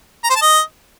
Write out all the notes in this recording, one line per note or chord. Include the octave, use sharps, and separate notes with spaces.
A#5
C5
A5
D#5